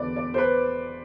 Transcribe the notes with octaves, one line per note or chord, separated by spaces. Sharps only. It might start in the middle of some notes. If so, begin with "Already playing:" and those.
Already playing: E1 E2 D3 B4 D5
D5
C5
B4